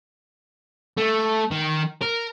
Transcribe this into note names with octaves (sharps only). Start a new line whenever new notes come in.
A3
D#3
A#4